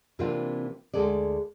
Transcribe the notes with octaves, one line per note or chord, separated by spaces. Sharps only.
C3 E3 A#3 C4 D4 F4
D2 G2 G#3 G#4 A4 D5